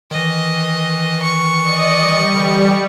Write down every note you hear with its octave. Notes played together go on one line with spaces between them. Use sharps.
D#3 E3 D#5
C#6
D5 D#5 D#6
G3
D3 E3